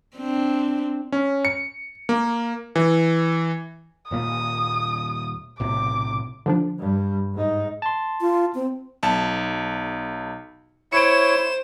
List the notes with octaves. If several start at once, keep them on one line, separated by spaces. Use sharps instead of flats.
C4 D4
C#4
C#7
A#3
E3
D#1 A#2 A#3 D#6
B1 A2 C3 D6
D3 F3 D4
G2 G3
G#2 D#4
A5 C6
F4
C4
B1 A5
E4 C5 C#5 C#7 D7 E7